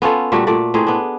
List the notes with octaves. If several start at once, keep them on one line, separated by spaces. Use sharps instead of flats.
B3 C#4 F4 A4
A#2 G3 A3 F#4
A#2 A3 D5
A2 C4 D#4 G#4
B3 D4